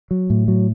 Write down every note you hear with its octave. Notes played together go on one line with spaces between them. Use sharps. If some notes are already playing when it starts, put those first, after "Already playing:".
F#3
A2
F#3